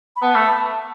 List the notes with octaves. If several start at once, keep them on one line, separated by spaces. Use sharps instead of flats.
B5
B3 A5
A3